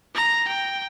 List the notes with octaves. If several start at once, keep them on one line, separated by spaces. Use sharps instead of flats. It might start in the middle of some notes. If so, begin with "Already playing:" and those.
A#5
G5